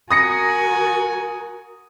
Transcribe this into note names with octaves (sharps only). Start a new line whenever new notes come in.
F#4 A#4 G#5 D#6 A#6 C#7